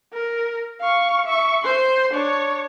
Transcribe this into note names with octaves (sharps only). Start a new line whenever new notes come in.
A#4
F5 C#6
E5 C#6
C5 C6
D4 C#5